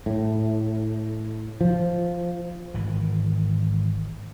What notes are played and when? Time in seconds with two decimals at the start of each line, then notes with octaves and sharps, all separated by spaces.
0.06 A2
1.61 F3
2.74 G#1 E3